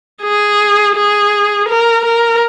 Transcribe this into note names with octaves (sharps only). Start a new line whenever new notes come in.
G#4
G#4
A#4
A#4